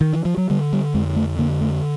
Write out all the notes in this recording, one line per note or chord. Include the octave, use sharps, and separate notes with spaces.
D#3
E3
F3
F#3
D3 G3
G3
F2 G#3
A3
D3 A#3
A3